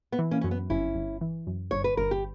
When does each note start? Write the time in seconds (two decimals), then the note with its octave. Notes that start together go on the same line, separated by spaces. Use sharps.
0.12 B3
0.19 E3
0.31 A#3 C#4
0.41 F#2 C#4
0.51 B3
0.70 G1 C#4 E4
0.95 G1
1.21 E3
1.47 F#2
1.71 G1 C#5
1.84 B4
1.97 G1 A#4
2.11 G4